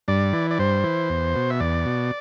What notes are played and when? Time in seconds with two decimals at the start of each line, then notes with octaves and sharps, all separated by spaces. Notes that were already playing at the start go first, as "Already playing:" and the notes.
0.08 G2 D5
0.33 E3
0.51 D5
0.59 G2 C5
0.84 E3
1.10 E2
1.36 B2
1.50 E5
1.60 E2 D5
1.86 B2